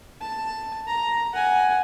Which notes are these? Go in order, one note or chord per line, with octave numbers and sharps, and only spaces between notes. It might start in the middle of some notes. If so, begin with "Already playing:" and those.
A5
A#5
F#5 G#5